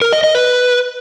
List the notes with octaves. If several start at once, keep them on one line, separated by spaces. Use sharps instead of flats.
A#4
D#5
D#5
B4